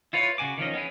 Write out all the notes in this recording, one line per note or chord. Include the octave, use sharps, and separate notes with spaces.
E4 F4 B4 C#5
C#3 F#4 G#5 D6
D#3 F3 C#4 D#5
B3 C#4 E4 G#4